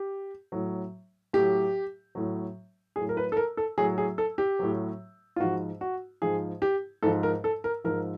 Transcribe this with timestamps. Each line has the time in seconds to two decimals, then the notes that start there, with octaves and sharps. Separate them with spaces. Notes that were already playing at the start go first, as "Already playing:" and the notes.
Already playing: G4
0.52 A2 F#3
1.33 A2 F#3 G4
2.15 A2 F#3
2.96 A2 F#3 G#4
3.09 A#4
3.17 B4
3.32 A4
3.37 A#4
3.57 A4
3.78 A2 F#3 G#4
3.98 G#4
4.18 A4
4.38 G4
4.59 A2 F#3
5.36 F4
5.40 G#2 F3 F#4
5.81 F#4
6.22 G#2 F3 G#4
6.62 G4
7.03 G#2 F3 A4
7.23 A#4
7.44 A4
7.64 A#4
7.84 G#2 F3 A#4